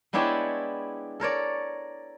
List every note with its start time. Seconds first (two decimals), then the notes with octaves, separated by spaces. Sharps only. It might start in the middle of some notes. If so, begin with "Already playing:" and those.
0.13 G#3 B3 D4 E4 G4 C#5
1.20 A4 A#4 C#5 D5